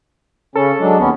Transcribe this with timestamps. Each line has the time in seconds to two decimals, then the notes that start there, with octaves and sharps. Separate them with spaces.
0.55 C#3 C#4 A4
0.80 F#3 G#3 D4
0.99 D#2 B3 C#4